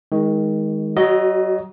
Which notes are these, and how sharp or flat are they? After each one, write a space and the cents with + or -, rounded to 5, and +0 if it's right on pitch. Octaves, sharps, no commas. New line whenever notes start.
D#3 +25 G#3 +0
F#3 +35 F#4 +0 D#5 +0